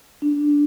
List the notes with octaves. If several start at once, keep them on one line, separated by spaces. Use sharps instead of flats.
D4